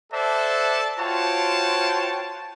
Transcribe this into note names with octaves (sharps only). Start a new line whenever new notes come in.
A4 C5 D5 E5 F#5 A5
F4 F#4 C5 C#5 G5 A5